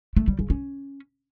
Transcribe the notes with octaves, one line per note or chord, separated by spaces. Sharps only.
A3
G3
C#3
C#4